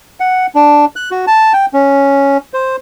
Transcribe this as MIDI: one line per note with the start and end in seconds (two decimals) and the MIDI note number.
0.20 0.46 78
0.55 0.85 62
0.96 1.10 90
1.11 1.25 66
1.27 1.53 81
1.53 1.66 79
1.73 2.38 61
2.54 2.76 72